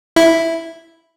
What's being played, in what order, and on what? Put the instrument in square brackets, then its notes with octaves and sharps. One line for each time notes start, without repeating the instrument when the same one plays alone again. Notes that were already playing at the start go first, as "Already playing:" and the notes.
[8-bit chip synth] E4